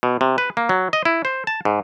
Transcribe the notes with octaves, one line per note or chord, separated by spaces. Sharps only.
B2
C3
B4
A#3
F#3
D#5
E4
C5
A5
G#2